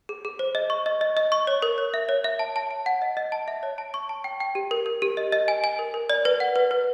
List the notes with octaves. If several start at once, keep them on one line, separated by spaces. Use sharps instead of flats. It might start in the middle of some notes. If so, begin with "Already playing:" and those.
G#4
G#4
C5
D#5
C#6
D#5
D#5
D#5
C#6
C#5
A#4
C#5
E5
C#5
E5
A5
A5
A5
F#5
D#5
D#5
A5
E5
C#5
A5
C#6
A5
G5
G5
G4
A#4
A#4
G4
D#5
D#5
G#5
G#5
A#4
A#4
D5
B4
F#5
B4
B4